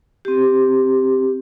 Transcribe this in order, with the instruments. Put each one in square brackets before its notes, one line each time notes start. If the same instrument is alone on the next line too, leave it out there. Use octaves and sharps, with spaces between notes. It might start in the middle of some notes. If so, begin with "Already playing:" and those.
[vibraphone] C4 G4